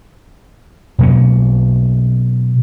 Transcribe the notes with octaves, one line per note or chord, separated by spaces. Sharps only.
B2 F#3 A#3 C#4